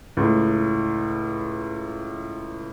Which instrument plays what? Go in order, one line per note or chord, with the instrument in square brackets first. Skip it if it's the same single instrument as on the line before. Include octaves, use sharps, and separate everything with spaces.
[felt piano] C#2 A2